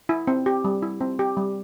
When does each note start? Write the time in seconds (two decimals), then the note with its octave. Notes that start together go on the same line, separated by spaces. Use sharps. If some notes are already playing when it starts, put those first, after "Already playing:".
0.09 E4
0.27 C4
0.46 G4
0.65 G3
0.82 E4
1.01 C4
1.19 G4
1.37 G3